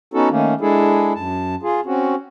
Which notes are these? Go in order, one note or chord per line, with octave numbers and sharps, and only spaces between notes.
B3 C#4 D#4 F#4 A4
D#3 A3 A#3 C#4
G#3 D4 E4 G#4 A4
F#2 A5
F4 G#4
C4 C#4 F#4